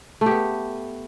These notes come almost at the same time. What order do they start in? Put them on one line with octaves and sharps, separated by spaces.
A3 G4 B3